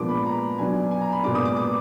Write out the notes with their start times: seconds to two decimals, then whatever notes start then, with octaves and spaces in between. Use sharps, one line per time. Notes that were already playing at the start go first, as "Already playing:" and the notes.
Already playing: A#2 F3 G#3 B3 D4 D6
0.09 B5
0.26 A#5
0.58 B2 F#3 D4 G#5
0.91 G#5
1.01 A#5
1.12 B5
1.23 A#2 G#3 B3 D4 D6
1.35 D#6
1.45 D6
1.56 D6